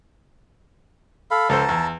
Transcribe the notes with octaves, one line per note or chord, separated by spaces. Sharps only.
A4 F5 B5
C#2 A4 C5 A5 A#5
E2